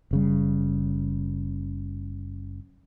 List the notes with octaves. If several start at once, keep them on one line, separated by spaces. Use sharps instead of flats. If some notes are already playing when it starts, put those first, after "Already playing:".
F#1 C#3 G3